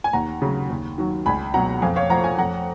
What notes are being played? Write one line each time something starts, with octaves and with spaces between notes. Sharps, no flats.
G#5
D#2 F#5 A#5
C#3 F#3
D#2
D#3 F#3
C#2 G#5 B5
B2 F#3 F#5 A#5
F2 F5 G#5
C#5 F5
F3 F#5 A#5
F5 G#5
F2 F#5 A#5